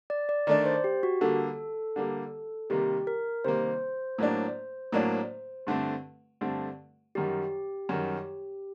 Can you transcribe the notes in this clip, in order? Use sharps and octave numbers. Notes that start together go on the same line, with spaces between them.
D5
D5
D#3 A3 D4 D5
C5
G4
F#4
D3 G3 A#3 A4
D3 G3 A#3
C3 D#3 G3 A#3 G4
A#4
C3 D#3 G3 A#3 C5
A2 F#3 A#3 D4
A2 F#3 A#3 D4
G2 D3 A3 C4
G2 D3 A3 C4
F#2 D#3 G3 G4
F#2 D#3 G3